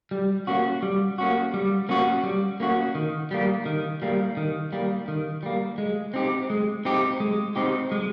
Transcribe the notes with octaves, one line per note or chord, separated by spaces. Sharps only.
G3
A#3 C#4 F#4
G3
A#3 C#4 F#4
G3
A#3 C#4 F#4
G3
A#3 C#4 F#4
D#3
G3 A#3
D#3
G3 A#3
D#3
G3 A#3
D#3
G3 A#3
G#3
C4 D#4 G4
G#3
C4 D#4 G4
G#3
C4 D#4 G4
G#3